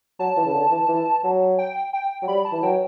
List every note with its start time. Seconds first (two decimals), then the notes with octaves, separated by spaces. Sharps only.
0.19 F#3 A5
0.37 E3
0.46 C#3
0.54 D3
0.71 E3
0.88 E3
1.24 F#3
1.58 G5
1.93 G5
2.22 F#3
2.28 G3 B5
2.45 A5
2.52 E3
2.62 F#3 G5